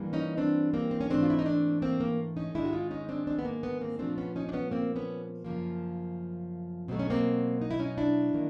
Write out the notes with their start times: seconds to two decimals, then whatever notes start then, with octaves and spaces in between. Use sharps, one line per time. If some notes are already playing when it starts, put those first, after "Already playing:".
Already playing: G2 E3 G3 A#3
0.13 C#4 D#4
0.37 C4 D4
0.74 A#3 C4
0.91 C4
1.01 C#4
1.10 G#2 E3 A3 C4 D4
1.22 F4
1.30 E4
1.39 D#4
1.46 C4 D4
1.82 A#3 C4
2.00 A#3
2.37 C#4 D#4
2.54 G#2 D#3 G#3 D4 E4
2.65 F#4
2.73 D#4 F4
2.91 C#4 D#4
3.09 C4 D4
3.27 C4 D4
3.39 B3
3.45 A#3
3.63 B3
3.81 A#3 C4
3.99 A#2 F3 A3 C4 D4
4.18 B3 C#4
4.36 C#4 D#4
4.49 D4
4.53 B3 C#4
4.71 A#3 C4
4.96 B3 C#4
5.44 F#2 C#3 F3 A#3
6.88 B2 F#3 A3 C4
6.99 C#4
7.10 A#3 C4
7.61 D#4
7.71 E4
7.79 C#4 D#4
7.98 D4 E4
8.34 D#3 F#3 A#3